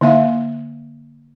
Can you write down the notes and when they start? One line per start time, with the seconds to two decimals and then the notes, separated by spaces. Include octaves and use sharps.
0.01 D3 A#3 E5 F5